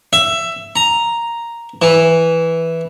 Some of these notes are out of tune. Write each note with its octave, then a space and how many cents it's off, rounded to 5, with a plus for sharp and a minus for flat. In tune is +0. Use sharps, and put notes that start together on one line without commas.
E5 +15
A#5 +0
E3 -5